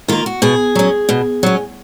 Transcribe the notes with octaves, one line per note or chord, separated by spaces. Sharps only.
D#3 A#3 F4
F#4
B2 G#4
F#3 C#4
B2
F#3 C#4